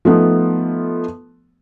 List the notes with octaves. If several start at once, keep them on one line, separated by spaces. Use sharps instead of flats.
F3 A3 B3 D#4